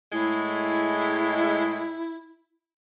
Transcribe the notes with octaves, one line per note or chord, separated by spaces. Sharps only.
A2 G#3 E4